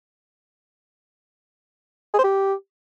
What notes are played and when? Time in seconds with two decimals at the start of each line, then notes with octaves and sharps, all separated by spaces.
2.14 G#4
2.19 C5
2.24 G4